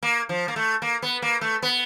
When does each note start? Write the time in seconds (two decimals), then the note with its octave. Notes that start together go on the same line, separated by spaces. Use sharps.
0.03 A#3
0.29 F3
0.48 A#3
0.56 A3
0.82 A#3
1.02 B3
1.22 A#3
1.41 A3
1.62 B3